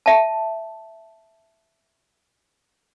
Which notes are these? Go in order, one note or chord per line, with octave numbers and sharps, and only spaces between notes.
E5 A5